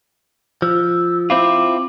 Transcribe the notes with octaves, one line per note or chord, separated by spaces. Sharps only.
F3 E6
C4 E4 F4 D6